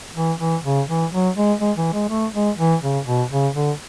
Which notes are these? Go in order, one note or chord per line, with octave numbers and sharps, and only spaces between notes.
E3
E3
C#3
E3
F#3
G#3
G#3
E3
G#3
A3
G#3
E3
C#3
B2
C#3
D3